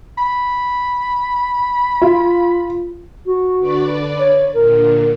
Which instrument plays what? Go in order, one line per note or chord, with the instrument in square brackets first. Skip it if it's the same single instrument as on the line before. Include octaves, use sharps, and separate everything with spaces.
[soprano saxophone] B5
[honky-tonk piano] F4
[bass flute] F#4
[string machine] D3 B4 D5
[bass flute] C#5
[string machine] A#2 D3 [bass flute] A#4